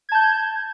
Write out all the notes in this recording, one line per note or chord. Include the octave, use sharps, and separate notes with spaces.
A5 G6 G#6